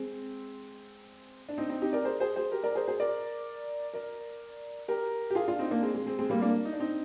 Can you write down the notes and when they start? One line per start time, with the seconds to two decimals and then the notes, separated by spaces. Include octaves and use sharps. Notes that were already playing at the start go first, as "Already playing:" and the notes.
Already playing: G#3 C4
1.49 D4
1.58 C4 D#4
1.69 C4 D#4
1.82 D#4 G4
1.93 A#4 D5
2.05 G#4 C5
2.20 G#4 C5
2.36 G#4 C5
2.52 G4 A#4
2.64 A#4 D5
2.75 G#4 C5
2.87 G#4 C5
3.00 A#4 D5
3.94 A#4 D5
4.88 G4 A#4
5.31 G4
5.35 F4 G#4
5.48 D4 F4
5.59 C4 D#4
5.71 A#3 D4
5.82 G#3 C4
5.94 G#3
6.06 G#3 C4
6.19 G#3 C4
6.30 G3 A#3
6.42 A#3 D4
6.65 D#4
6.73 D4
6.80 C4 D#4